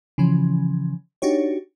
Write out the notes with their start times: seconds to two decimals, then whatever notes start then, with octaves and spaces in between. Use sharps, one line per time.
0.18 C#3 E3 F3 C#4
1.22 D4 D#4 F#4 G4 C#5